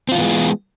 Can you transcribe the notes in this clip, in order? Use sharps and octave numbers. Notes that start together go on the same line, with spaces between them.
E3 G#3 B3 C4 F4